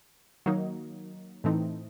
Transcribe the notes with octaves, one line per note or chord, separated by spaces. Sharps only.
D#3 F#3 A#3 D#4
A2 E3 A3 C4 D#4